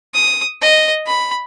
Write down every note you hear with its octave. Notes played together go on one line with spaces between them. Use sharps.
D#6
D#5
B5